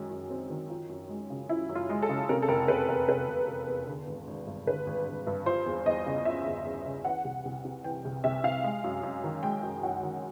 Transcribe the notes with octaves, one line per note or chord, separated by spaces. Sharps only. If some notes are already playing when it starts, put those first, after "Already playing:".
Already playing: F#2 D#3 G#3
F#2
C4
D#3
F3
F#2
G#3
C#3
F3 E4
F#2
F4
G#3
A4
C#3
C3 A#4
A4
F1 A#4
F1 B4
E2 A#4
C3 B4
F1
F1
E2
D3
G#1
G#1
G2
D3 B4
G#1
G#1
G2
F3 C5
E2
E2 D#5
C#3
F3 E5
E2
E2
C#3
E3 F#5
C2
C2
C3
E3 G5
C2
C2 E5
C3 F5
G#3
F#2
F#2
D#3
G#3 G5
F#2
F#2 F#5
D#3